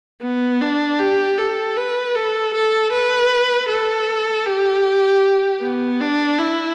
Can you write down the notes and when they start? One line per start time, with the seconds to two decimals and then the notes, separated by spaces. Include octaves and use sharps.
0.22 B3
0.61 D4
0.99 G4
1.38 A4
1.76 B4
2.15 A4
2.54 A4
2.92 B4
3.69 A4
4.46 G4
5.62 B3
6.01 D4
6.38 E4